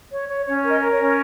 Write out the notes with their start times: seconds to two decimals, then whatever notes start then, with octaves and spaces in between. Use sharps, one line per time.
0.11 C#5
0.28 C#5
0.46 C#4 C#5
0.63 A#4
0.69 D#5
0.80 A#4
0.92 C#5
0.98 C#4